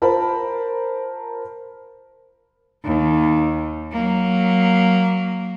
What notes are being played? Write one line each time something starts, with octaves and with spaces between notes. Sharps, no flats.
F4 A#4 C5 A5 B5
D#2
F#3 A#3